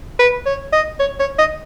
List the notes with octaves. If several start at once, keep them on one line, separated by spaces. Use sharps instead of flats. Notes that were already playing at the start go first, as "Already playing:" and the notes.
B4
C#5
D#5
C#5
C#5
D#5